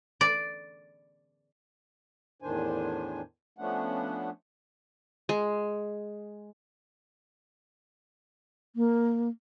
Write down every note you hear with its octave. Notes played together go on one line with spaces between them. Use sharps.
D5
E2 A2 D#3 D4 C5 G#5
F3 A3 B3 C#4 D4 F#5
G#3
A#3